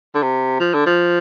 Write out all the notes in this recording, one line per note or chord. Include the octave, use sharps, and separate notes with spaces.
D3
C3
F3
D3
F3